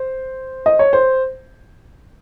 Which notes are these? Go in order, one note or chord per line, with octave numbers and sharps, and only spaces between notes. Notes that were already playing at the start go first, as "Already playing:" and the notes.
Already playing: C5
D#5
C#5
C5